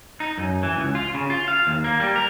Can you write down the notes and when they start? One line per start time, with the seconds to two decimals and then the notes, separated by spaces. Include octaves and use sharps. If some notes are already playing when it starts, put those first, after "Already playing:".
0.20 D#4
0.38 F#2
0.63 E3
0.77 C#2
0.95 F4
1.14 C#3
1.30 F4
1.48 F5
1.67 D#2
1.84 A#3
2.00 G3
2.16 A#4